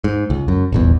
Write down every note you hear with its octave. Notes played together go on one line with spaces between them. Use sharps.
G#2
C#2
F#2
D#1 G#1 E2